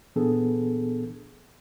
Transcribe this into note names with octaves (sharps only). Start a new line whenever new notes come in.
A#2 E3 B3 D4 G#4 A4